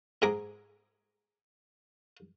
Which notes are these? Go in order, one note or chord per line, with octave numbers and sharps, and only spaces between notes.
G#2 G#4 A#5 D6